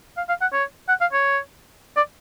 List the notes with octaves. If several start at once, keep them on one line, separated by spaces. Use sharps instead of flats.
F5
F5
F#5
C#5
F#5
F5
C#5
D5